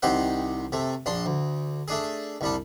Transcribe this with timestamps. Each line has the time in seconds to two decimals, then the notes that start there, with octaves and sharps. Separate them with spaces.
0.02 C2 D#3 C4 G4 F#5
0.72 C3 A3
1.06 A#1 D4 C6
1.26 D2
1.88 A3 D4 G#4
2.41 C2 G3 D4